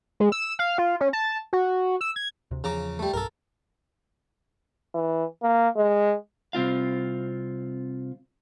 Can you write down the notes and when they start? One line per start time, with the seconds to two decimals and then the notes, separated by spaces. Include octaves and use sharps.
0.20 G#3
0.32 E6
0.59 F5
0.78 F4
1.00 C#4
1.13 A5
1.53 F#4
2.01 E6
2.16 G#6
2.51 D2 C3
2.64 E2 C#3 F3 A#5 D6
2.99 G3 A3
3.14 B1 G2 A4 A#4
4.94 E3
5.42 A#3
5.76 G#3
6.53 C2 C4 F4 F5